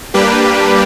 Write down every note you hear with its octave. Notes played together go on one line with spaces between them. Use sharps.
G3 A#3 D4 G4 B4